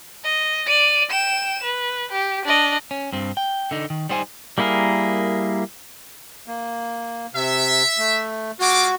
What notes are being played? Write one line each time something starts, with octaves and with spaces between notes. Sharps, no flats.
D#5
D5 D#7
G5 E7
B4
G4
D4 D#5
C#4
G2 C4
G5
D3 D#4
D#3
G3 D#4 C5 G5 G#5
G3 A#3 E4 G#4 A#4
A#3
C3 E5
A3
G#3 F4 F#4 D6